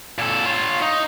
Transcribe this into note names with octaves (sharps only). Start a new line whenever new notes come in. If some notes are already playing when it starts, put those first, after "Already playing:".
A#2 A4
F4 C#5
D#4